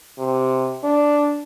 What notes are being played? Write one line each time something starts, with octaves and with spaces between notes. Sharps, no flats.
C3
D4